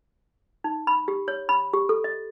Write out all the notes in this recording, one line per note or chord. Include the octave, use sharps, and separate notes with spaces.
D#4
B5
G4
C#5
B5
G4
A4
D#5